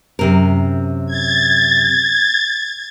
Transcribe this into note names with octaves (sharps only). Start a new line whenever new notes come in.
F#2 C3 A#4
G#6 A6